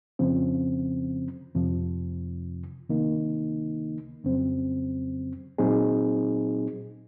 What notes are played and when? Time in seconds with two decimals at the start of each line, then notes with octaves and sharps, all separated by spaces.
0.19 F2 C#3 F3 C4
1.55 F2 C3 F3
2.89 C#2 C3 D#3 A#3 D#4
4.24 F2 C#3 F#3 C4
5.58 A#2 F#3 C4 D#4 G#4